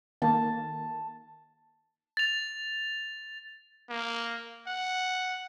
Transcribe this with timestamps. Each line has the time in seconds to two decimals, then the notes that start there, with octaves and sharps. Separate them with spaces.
0.22 D#3 A#3 A5
2.17 A6 F7
3.89 A#3
4.67 F#5